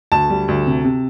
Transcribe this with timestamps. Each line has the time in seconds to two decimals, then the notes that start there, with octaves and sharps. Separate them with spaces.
0.12 D2 A5
0.30 G3
0.48 D2
0.66 C3
0.85 C3